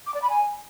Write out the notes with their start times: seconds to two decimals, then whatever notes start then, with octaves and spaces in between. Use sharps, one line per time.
0.07 D6
0.14 D5
0.22 B5
0.30 G#5